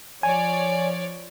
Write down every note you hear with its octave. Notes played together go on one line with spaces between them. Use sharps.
F3 C#5 D5 G#5